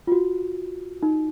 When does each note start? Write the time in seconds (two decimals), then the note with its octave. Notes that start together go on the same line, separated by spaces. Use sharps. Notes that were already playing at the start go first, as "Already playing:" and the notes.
0.07 F4
0.12 F#4
1.02 D#4